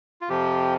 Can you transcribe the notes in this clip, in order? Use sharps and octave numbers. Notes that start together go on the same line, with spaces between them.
F4
F2 C3 F3 G4